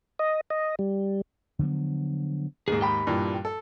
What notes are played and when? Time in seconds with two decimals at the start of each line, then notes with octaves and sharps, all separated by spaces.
0.19 D#5
0.50 D#5
0.79 G3
1.59 D3 F3 F#3 B3
2.68 D#2 G#2 G#4
2.81 G4 G5 B5
3.07 G2 A#2 E3
3.45 A4